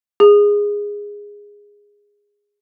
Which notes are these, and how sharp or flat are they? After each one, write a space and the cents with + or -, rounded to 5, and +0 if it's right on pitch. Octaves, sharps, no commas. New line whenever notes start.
G#4 -15